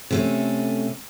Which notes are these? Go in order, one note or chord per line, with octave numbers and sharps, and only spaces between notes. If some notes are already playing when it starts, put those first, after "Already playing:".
C3 A3 C#4